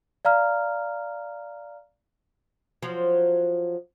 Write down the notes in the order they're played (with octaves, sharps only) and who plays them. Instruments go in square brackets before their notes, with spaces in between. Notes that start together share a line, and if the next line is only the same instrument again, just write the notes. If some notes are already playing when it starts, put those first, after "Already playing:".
[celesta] D5 F5 A#5 F6
[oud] F3 F#3